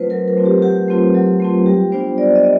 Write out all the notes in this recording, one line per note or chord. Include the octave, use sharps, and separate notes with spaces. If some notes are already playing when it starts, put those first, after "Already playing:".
Already playing: F#3 A3 C4 F4 B4 C5
F#3 A#4
A#4
A3 C4 F4
G4
F#3 G4
A3 C4 F4
F#3
A3 C4 F4
G3 G4
B3 D4 F4 C5
G3 D5
D#5
B3